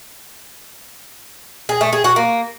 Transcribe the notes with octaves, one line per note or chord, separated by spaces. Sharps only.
G#4
A3
G#4
F#4
A#3